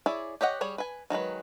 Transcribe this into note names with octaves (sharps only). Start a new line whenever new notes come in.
E4 G#4 C#5 D5
G4 C#5 D#5 F#5
G3 G#4 C#5
B4 G#5
D#3 F#3 G#3 B4